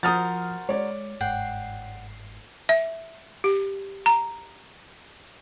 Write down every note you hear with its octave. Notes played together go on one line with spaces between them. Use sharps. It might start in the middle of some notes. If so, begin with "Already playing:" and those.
F3 F#4 A#4 C5 D#6 F6 A6
G#3 C#5 D5
G1 G#2 F#5 G5 C7
E5
G4
A#5